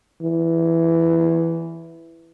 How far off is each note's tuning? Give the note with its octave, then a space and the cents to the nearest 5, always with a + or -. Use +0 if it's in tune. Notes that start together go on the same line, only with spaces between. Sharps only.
E3 +5